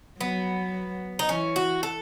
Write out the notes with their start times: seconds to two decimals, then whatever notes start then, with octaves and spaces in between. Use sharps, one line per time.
0.21 F#3 B3
1.19 D#4
1.29 E3 C#4
1.56 F#4
1.83 A4